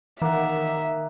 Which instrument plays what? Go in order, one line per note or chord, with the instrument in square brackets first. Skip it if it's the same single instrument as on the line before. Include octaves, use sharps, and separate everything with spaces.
[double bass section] D#3 [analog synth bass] E3 [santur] A#3 F#5 [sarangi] E5